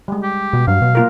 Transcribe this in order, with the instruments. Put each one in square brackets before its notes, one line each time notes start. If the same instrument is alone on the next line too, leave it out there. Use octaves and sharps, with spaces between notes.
[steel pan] G3 G#3
[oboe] G4
[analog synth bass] B2
[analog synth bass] G2 [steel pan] F#3 [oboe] F5
[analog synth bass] B2
[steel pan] A#3 F4 A#4